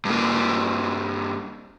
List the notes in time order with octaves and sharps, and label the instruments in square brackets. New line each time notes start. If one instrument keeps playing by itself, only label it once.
[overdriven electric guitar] G2 A#3